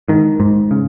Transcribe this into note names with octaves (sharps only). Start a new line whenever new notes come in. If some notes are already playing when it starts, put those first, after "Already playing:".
G#2 D#3
G#2
C#3